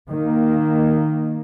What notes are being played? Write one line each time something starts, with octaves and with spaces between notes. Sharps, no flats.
D#3 A#3